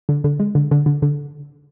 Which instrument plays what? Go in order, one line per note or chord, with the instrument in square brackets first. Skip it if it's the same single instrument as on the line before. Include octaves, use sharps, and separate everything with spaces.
[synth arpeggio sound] D3
D3
G#3
D3
D3
D3
D3